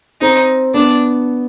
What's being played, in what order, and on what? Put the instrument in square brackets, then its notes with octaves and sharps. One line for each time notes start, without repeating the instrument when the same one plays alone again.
[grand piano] C4 [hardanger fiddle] D#4
[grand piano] B3 [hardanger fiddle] D4